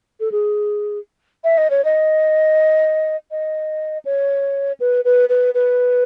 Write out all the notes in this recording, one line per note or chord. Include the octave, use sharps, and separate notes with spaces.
A4
G#4
E5
D#5
C#5
D#5
D#5
C#5
B4
B4
B4
B4